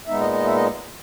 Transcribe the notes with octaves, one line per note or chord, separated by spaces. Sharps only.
A#2 G#3 B3 D#4 E5
D#5
D#5
E5
D#5